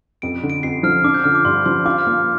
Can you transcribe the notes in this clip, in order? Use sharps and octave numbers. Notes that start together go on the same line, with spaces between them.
F2 D7
D3
D7
F2 C7
F3 F6
D4 D6
G6
D3 F6
D6
G2 C6
F3 C6
F4 D6
F6
A#3 D6